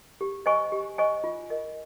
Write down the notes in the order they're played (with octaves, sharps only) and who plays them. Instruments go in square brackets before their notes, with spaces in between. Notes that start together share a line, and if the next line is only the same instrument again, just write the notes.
[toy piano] G4
C5 D#5 G#5 C#6
G4
C5 D#5 G#5 C#6
F4
A#4 D#5